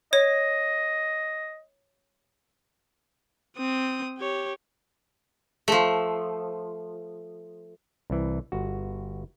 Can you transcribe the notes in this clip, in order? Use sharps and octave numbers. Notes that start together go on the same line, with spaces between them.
C#5 D#5
C4 D#6
G4 C#5
F3 A3
C2 E3
G1 F#4